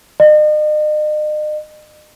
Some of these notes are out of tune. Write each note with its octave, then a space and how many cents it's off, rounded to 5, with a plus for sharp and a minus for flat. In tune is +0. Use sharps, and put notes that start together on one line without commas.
D#5 -40